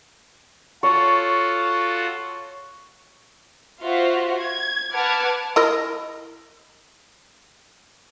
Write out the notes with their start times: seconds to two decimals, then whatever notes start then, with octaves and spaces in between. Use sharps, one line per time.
0.83 F4 F#4 A4 C#5
3.80 F4 F#4 C5 E5 F#5
4.40 G#6
4.93 B4 F#5 A5 D6 F6 G#6
5.56 E4 A#4 D#5